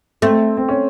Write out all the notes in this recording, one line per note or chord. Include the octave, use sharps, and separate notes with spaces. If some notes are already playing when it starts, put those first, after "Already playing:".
A3 C4
C4
C#4